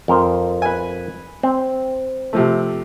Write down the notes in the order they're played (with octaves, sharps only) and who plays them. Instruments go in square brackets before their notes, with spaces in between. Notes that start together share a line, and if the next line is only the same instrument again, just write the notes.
[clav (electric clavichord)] F2 A#4 C5
[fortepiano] B4 G#5
[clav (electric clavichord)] C4
[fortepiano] C3 F3 A3